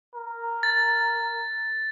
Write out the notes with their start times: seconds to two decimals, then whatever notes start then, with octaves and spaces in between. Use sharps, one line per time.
0.15 A#4
0.63 A6